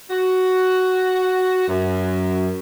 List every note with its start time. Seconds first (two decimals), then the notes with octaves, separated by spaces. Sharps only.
0.10 F#4
1.68 F#2